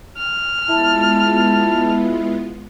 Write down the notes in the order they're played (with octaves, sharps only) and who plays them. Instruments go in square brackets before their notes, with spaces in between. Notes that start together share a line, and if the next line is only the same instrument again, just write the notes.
[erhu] F6
[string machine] G#3 B3 F4 [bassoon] E4 [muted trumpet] A5